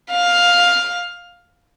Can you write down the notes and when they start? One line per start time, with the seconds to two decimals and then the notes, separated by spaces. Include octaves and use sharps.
0.12 F5